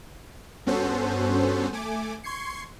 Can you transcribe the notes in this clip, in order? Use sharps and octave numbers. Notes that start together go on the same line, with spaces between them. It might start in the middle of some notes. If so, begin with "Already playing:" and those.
G2 B3 C#4 F#4 A4 C5
A3 G#5 D6
C6 C#6 G#6 C7 C#7